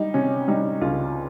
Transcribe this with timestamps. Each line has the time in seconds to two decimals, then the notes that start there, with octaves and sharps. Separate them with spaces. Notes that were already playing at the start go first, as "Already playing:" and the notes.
Already playing: G3 D#4
0.14 C3 C#4
0.48 G3 D#4
0.81 C#2 F4